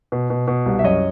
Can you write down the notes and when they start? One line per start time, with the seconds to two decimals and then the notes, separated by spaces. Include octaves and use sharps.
0.12 B2
0.30 B2
0.48 B2
0.66 C2
0.79 E5
0.84 F#2 C#5 D#5